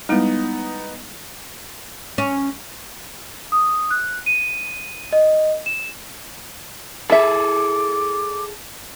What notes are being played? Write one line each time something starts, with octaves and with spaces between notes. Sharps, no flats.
G3 G#3 B3 D#4 E4
C#4
D#6
F#6
D#7
D#5
E7
E4 G#4 A4 E5 D6